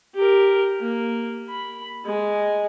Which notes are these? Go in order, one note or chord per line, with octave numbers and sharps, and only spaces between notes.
G4 A#4
A#3
B5
G#3